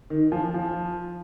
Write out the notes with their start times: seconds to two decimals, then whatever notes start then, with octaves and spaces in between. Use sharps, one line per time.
0.10 D#3
0.32 F3
0.54 F3